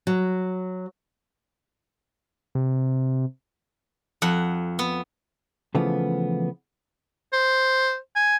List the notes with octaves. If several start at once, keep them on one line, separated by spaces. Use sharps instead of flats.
F#3
C3
F2 F#5
B3
C#3 E3 F3 A3 B3
C5
G#5